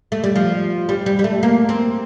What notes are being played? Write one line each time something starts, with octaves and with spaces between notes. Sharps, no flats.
A3
G3
F3
G3
G3
G3
A3
A#3
C4